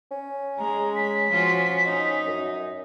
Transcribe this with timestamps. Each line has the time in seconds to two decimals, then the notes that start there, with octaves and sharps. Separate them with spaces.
0.12 C#4
0.58 G#3 A#5
0.96 B6
1.31 F3 F4 F#4
1.85 D#4
2.27 F#2